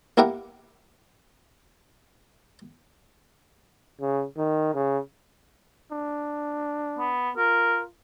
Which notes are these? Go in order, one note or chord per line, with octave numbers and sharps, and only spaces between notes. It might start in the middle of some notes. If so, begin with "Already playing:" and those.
A#3 E4 G4 A#4 F#5 G5
C#3
D#3
C#3
D4
B3
F4 A#4